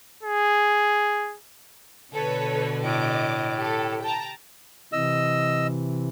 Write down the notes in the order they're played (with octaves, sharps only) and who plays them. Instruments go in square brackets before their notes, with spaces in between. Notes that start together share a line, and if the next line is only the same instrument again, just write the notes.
[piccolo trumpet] G#4
[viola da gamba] B2 D3 [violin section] A4 B4 C#5
[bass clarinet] A2 [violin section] D#5 D6
[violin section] G4 A4
G5 A5 A#5
[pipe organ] C3 E3 [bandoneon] D#5 E6